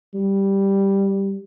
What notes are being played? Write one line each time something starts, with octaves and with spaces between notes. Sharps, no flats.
G3